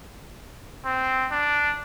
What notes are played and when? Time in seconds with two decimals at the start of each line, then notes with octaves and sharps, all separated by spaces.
0.85 C4
1.31 D4